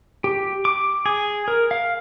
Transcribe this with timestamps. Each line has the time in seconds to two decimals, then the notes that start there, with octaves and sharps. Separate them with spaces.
0.24 G4
0.65 D6
1.06 G#4
1.48 A#4
1.71 F5